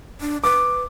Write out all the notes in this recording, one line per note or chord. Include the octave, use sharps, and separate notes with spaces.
D4
B4 D6